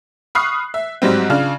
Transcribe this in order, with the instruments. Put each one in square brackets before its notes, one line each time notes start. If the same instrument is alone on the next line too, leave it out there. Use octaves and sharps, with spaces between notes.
[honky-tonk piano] B5 C#6 D#6 F6 F#6 C7
E5
G#2 F#3 G3 C4
C#3 D4 F4 F6